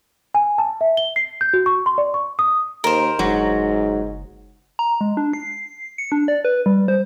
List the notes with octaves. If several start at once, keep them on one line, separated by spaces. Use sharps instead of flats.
G#5
A5
E5
G7
C7
G6
F#4
C#6
C6
D5
C#6
D#6
D#2 A#4 C5
F#1 G#2 F#3
A#5
G#3
D4
C7
C#7
D4
D5
B4
G3
C5